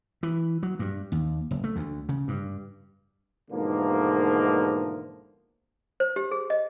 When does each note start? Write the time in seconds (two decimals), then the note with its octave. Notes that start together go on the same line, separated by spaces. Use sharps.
0.23 E3
0.63 F#3
0.79 G2
1.12 D#2
1.51 F#1
1.64 A3
1.76 D2
2.09 C#3
2.28 G2
3.51 G#2 B2 D3 E3 F3 A#3
6.00 C5
6.16 G4
6.31 G#4
6.50 D#5